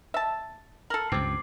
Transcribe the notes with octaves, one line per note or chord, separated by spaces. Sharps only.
E5 A5
A4 A#4 F#7
C#2 G2 C4 D6 C7